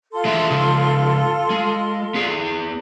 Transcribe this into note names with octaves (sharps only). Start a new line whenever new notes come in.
F4 A4 C6
E3 G#3 E5
C#3 F3 G#3
G#3
B3 G#4